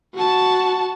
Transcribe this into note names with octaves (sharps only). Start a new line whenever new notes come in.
F#4 A5